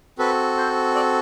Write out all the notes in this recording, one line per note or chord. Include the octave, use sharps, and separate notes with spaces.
C4 F#4 A4 B4
C5
D5